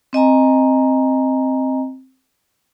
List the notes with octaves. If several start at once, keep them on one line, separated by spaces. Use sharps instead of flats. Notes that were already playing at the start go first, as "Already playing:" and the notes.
C4 D#5 G#5 A#5